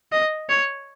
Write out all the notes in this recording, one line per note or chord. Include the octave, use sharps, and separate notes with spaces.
D#5
C#5